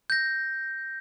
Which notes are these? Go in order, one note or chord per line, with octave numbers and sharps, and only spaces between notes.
G6 A#6